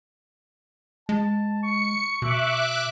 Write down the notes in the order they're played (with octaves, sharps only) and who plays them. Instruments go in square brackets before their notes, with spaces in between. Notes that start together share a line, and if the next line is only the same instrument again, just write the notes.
[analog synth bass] G#3 [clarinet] A5
[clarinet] C#6 [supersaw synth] C#7
[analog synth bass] B2 [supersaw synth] E5 D6 F#6